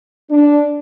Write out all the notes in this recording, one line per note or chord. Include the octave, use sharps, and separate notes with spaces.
D4